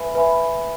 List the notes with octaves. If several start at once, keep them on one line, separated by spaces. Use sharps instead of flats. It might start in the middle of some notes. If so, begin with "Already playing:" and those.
Already playing: B4 E5 G#5 B5
B4 E5 G#5 B5